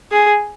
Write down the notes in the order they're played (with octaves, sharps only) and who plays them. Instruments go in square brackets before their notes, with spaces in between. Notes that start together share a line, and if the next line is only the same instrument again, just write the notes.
[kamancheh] G#4